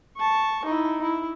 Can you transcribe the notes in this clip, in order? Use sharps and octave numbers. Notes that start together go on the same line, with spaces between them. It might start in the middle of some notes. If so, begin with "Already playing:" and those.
A5 C#6
D#4 E4
E4